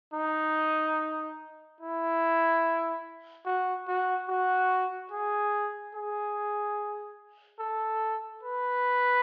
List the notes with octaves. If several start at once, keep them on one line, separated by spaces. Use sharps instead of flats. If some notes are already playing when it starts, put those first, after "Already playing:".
D#4
E4
F#4
F#4
F#4
G#4
G#4
A4
B4